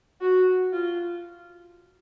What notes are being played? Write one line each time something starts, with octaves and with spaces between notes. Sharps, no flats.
F#4
F4